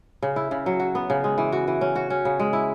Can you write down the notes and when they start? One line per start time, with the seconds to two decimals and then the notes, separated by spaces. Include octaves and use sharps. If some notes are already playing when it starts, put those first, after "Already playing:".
0.22 C#3
0.36 E4
0.51 C#3
0.66 F#3
0.80 F#4
0.95 B3
1.10 C#3
1.24 G#3
1.38 E3
1.52 F#4
1.67 E3
1.81 C#4
1.96 F#4
2.10 C#4
2.25 C#3
2.40 G#3
2.53 E4